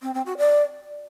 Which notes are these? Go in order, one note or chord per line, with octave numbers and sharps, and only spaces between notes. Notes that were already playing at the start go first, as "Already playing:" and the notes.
C4
C4
F#4
D5